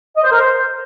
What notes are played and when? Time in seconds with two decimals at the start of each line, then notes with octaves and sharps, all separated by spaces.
0.16 D#5
0.23 C5
0.30 A#4
0.38 C5